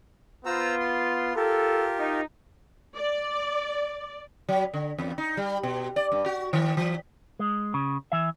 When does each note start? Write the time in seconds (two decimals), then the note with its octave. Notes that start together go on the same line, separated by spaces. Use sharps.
0.46 B3 F4 C5 A#5 E6
0.80 C6
1.36 F4 G4 A4 A#4
1.98 D#4
2.96 D5
4.49 F#3
4.74 D3
4.98 E2
5.18 D#4
5.37 G3
5.63 B2
5.96 D5
6.12 G2
6.26 F#4
6.53 D#3
6.77 E3
7.39 G#3
7.74 C#3
8.12 E3 E5